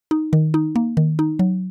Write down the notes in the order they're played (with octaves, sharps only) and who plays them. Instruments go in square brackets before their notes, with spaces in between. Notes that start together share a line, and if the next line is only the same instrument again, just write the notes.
[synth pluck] D#4
D#3
D#4
A#3
D#3
D#4
F#3